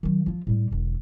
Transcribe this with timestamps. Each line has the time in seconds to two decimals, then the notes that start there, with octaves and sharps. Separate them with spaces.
0.03 D#3 F#3
0.26 F3 F4
0.47 A2 G3
0.71 E1 D3